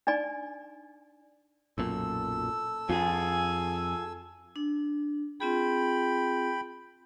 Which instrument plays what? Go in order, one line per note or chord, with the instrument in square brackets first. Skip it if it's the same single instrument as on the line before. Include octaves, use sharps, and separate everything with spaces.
[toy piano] D4 D#4 D5 G#5
[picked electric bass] B1 F#2 A#2 [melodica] A4 E6
[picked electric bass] F2 [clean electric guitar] F4 G#4 [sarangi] G#5
[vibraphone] D4
[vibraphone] C4 F4 G#4 [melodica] G5 B5